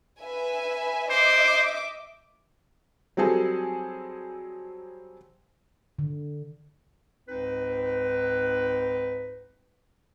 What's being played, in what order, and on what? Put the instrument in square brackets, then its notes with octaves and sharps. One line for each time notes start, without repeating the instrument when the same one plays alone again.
[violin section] B4 E5 G#5
[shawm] C5 [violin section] D#5 E5 D6
[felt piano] F#3 G3 C4 G#4 A4
[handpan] D3
[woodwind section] C#2 G#2 C4 D#4 B4